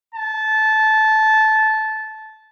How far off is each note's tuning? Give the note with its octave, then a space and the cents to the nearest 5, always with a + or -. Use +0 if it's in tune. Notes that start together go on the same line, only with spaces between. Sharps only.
A5 -15